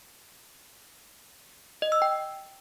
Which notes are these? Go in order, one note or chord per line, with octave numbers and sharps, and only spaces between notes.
D#5
E6
G5